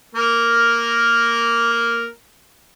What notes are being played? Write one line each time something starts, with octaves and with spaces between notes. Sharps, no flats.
A#3 A#4